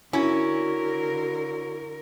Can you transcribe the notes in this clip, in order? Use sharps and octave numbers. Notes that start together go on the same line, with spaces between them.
D3 C#4 E4 F#4 A#4